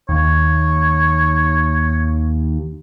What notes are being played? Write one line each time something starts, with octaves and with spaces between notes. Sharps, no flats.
D#2 C#5